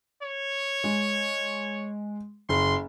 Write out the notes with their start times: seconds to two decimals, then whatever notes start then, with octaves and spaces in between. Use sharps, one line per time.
0.22 C#5
0.84 G#3
2.49 F#1 C6